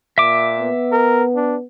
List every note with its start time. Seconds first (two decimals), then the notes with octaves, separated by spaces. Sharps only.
0.18 A#2 E5 D6
0.59 B3
0.92 A#4
1.35 D4